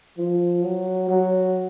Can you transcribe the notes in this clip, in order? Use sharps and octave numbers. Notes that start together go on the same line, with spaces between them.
F3
F#3
F#3